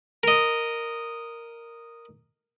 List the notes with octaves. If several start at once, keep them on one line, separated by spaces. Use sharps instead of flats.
A#4 D#5